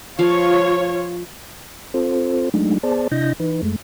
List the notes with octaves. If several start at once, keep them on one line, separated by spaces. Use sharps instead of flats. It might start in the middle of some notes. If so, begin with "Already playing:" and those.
F3 F4 C#5 F5
C4 F4 A4 C5
F#3 G#3 A3 D4 D#4
B3 G#4 C5 D5 A5
C3 D4 E4 D#5 G6 A#6
E3 D#4 B4
F#2 G#3 A3